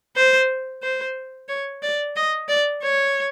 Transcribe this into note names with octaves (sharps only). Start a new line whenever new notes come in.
C5
C5
C#5
D5
D#5
D5
C#5